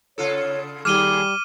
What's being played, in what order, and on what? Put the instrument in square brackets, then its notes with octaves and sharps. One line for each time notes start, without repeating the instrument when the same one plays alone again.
[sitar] C#3 F4 A4 [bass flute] C#5
[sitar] D#2 G#4 [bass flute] G3 [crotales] D6 D#7 G7 [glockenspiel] F6